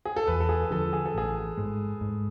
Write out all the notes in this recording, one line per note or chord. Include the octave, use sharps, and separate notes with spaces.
G#4
A4
E2 B4
A4
G#4
D3 F3 A4
G#4
A4
A1 G#4
G#2 G#3
G#2